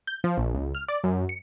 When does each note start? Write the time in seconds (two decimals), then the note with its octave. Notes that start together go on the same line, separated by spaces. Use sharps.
0.07 G6
0.24 F3
0.38 A#1
0.54 C#2
0.75 F6
0.88 D5
1.04 F#2
1.29 C#7